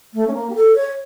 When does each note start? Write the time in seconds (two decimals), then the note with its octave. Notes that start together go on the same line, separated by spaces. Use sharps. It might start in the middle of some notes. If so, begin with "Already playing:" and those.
0.14 A3
0.27 C#4
0.34 A#3
0.50 G4
0.55 A4
0.75 C#5